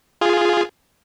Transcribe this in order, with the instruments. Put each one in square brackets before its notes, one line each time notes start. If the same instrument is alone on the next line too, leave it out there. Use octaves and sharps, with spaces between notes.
[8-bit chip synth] F4 G#4